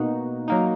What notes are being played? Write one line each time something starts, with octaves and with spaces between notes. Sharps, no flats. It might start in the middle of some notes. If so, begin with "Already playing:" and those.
Already playing: B2 A#3 D#4 F#4
F#3 A#3 D#4